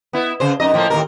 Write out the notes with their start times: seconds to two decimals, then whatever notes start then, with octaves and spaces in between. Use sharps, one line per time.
0.13 B3 E4
0.40 C#3 C5
0.60 F#2 D#4 D#5
0.74 A2 F3 A#3
0.90 D#2 A2 A#4